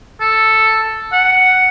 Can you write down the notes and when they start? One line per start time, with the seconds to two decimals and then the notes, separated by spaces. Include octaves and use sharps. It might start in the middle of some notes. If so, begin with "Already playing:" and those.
0.21 A4
1.13 F#5